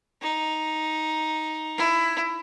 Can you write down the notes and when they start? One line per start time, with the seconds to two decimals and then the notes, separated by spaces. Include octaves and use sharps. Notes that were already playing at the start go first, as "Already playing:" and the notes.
0.22 D#4
1.77 E4